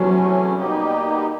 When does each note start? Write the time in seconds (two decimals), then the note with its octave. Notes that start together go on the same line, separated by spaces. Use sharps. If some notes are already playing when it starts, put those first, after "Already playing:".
Already playing: E2 C3 E3 F#3 A3 C#4
0.55 B2 G3 A#3 D#4 G4